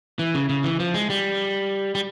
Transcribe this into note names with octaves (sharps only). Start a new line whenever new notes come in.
E3
C#3
C#3
E3
F3
G#3
G3
G3